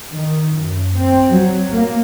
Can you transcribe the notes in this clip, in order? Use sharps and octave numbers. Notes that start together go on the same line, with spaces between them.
D#3
F#2
C4
F#3
A#3